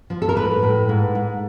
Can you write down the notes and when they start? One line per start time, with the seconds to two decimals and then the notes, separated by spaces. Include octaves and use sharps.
0.10 F3
0.22 A4
0.29 A#4
0.35 A2 B4
0.63 A2
0.89 G#2
1.15 G#2